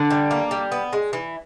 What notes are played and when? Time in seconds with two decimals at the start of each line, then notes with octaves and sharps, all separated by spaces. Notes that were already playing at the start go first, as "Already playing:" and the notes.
Already playing: D3
0.10 G3
0.31 A#3
0.51 G3
0.72 B3
0.93 G#3
1.13 E3